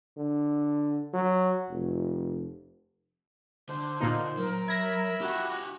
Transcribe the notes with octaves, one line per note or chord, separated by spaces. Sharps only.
D3
F#3
F1
D3 C5
A#2 A#3 D#4
F#3 A#4
E5 B5 G#6 A#6
F#4 G4 F#5